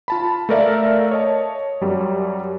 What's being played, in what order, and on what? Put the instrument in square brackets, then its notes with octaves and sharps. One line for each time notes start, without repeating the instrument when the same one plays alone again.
[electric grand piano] F4 A5 B5
A3 A4 A#4 D5 E5 F5
C#5 D#5 A5
F#2 F#3 G3